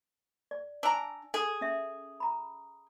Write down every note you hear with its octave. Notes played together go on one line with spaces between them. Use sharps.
D5
D4 G#5 A#5 E6
G#4 A4
C#4 E5
A#5 B5